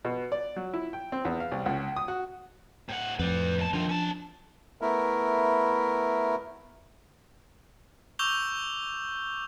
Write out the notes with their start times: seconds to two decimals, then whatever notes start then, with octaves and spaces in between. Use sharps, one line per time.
0.05 B2
0.32 D5
0.56 F#3
0.74 E4
0.93 G5
1.12 C4
1.25 E2
1.40 F5
1.52 C2
1.66 C#2
1.96 D#6
2.08 F#4
2.89 A2 F#5
3.20 F2 A2 B4 D5
3.58 D#2 A5
3.74 D#3 F3 D4 F4
3.89 C#4 A5
4.81 A3 B3 E4 A#4
8.19 C#6 D6 E6 G6 F7 G7